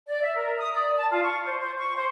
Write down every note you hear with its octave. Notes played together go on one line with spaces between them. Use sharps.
D5
E5
A#4
D#6
D5
A5
F4
C#6
C5
C5
C#6
C5